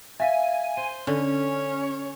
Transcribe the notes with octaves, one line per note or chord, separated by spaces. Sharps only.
E5 F5 G#5
C5 D#7
D3 C#4 C#5